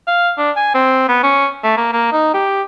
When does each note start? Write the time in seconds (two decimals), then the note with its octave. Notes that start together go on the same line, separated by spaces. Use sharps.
0.07 F5
0.38 D4
0.56 G#5
0.75 C4
1.09 B3
1.23 C#4
1.64 A3
1.77 A#3
1.93 A#3
2.12 D#4
2.34 G4